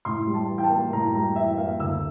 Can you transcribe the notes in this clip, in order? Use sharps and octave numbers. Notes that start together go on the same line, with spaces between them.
A2 C6
G3
A5
E3
G5
A5
A#3
A2 A#5
G3 A#5
E3 E5
A#3 F5
D2 E6